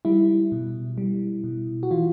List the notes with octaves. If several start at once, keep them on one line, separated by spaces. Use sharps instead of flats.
G3 E4
B2
G3
B2
F#4
E3 F4